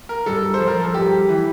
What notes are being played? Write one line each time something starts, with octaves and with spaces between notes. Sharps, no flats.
A#4
G2 A4
C5
F3
A#4
A4
G2 G4
E3